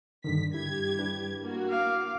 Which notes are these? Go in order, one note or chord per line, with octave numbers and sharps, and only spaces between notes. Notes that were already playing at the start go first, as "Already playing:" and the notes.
G2 D3 D#3 B6
G2 E4 G4 G#6
D4 E4 B4
A#3 F#4
F5 D6